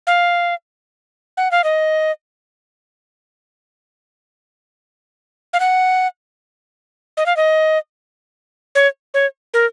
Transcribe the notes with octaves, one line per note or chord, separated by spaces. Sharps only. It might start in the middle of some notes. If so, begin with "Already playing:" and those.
F5
F#5
F5
D#5
F5
F#5
D#5
F5
D#5
C#5
C#5
A#4